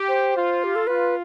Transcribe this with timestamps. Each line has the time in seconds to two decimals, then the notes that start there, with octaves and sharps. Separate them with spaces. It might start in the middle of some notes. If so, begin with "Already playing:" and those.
Already playing: G4
0.08 C5
0.36 F4
0.64 G4
0.76 A4
0.87 F4 B4